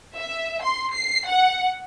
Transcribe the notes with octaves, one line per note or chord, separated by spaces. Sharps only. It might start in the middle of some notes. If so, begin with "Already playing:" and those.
E5
C6
C7
F#5